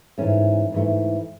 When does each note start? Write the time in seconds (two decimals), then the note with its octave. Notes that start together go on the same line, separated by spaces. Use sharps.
0.18 G#2 E3 A3 C#4
0.72 G#2 E3 A3